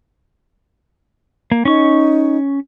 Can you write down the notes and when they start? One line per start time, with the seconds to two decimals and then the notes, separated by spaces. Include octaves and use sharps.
1.52 A#3
1.65 C#4 D#4 C#6